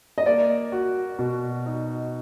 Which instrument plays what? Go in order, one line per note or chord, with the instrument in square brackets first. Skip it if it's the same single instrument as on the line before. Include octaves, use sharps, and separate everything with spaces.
[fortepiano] D#5
[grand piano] A#3 [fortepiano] D5
[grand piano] F#4
B2
D#4